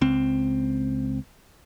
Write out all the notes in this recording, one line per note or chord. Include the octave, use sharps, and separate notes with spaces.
C#2 C4